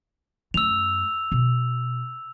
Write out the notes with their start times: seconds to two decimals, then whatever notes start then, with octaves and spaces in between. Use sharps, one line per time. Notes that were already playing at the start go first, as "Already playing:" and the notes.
0.54 F#2 A3 E6 F7
1.32 B2